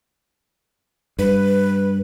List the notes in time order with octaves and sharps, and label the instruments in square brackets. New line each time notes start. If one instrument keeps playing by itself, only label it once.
[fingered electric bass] G2 [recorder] B4